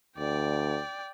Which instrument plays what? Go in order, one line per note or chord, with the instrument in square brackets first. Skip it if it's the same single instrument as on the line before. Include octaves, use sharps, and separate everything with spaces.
[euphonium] D2 [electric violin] D5 G5